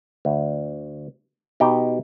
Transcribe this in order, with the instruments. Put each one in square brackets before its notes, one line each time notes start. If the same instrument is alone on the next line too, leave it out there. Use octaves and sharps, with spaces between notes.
[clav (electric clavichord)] D2
B2 D#4 G4 G5